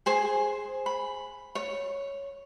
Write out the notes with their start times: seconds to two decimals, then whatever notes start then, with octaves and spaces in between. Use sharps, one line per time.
0.06 G#4 C5 G#5
0.86 B5
1.55 C#5